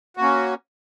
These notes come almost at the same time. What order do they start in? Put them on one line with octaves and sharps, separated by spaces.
F#4 A#3 C#4